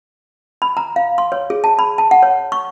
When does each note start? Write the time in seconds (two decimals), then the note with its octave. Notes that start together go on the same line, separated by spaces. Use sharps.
0.62 B5
0.77 A#5
0.96 F5
1.18 C6
1.32 C#5
1.50 G#4
1.64 A5
1.79 B5
1.98 A5
2.11 F#5
2.23 C#5
2.52 C#6